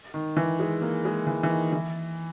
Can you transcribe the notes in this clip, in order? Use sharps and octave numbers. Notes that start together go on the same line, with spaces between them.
D#3
E3
G#3
A#3
G#3
E3
E3
D#3
E3